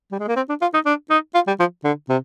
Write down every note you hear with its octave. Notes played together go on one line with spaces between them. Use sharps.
G3
G#3
A#3
C4
D4
F4
D#4
D4
D#4
F4
G3
F3
D3
C3